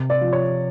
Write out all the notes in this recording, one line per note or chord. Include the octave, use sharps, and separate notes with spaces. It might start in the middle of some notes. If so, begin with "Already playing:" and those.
Already playing: C3
D5
F3
C#5